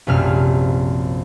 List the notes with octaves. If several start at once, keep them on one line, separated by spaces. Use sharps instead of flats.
A#1 F#2 C3 F6 E7